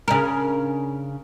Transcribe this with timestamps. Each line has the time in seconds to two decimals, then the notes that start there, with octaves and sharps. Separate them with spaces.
0.08 C#3 D4 A#4